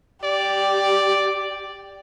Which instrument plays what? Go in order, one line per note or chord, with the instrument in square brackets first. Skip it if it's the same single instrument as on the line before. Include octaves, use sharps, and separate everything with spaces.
[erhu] G4 [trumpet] D5